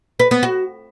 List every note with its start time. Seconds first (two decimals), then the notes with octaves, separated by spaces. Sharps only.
0.20 B4
0.31 B3
0.43 F#4